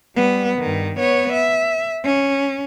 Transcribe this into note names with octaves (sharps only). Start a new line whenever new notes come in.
G3 B3
G2 D#3
B3 C#5
E5
C#4